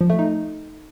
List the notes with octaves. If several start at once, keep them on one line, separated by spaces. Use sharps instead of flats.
F3
A3
D#4